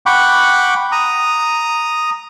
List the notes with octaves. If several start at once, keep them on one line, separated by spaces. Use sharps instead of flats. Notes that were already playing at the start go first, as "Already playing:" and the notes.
F#5 G5 B5 C#6 D6
A#5 D#6